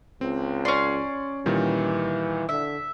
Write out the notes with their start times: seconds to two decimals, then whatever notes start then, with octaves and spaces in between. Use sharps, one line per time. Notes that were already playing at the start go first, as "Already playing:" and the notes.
0.21 C#2 C4
0.65 C#4 D5 C6 C#6
1.46 A#2 D#3 E3 G3
2.49 D3 E5